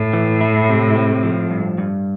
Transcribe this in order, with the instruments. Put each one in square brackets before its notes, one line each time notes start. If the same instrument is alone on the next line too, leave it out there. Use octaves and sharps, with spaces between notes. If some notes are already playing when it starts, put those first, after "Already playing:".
Already playing: [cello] A2
[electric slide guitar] E3
E4
C3
C4
F3
G2
G2